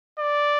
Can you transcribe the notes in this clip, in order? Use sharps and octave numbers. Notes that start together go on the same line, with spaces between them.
D5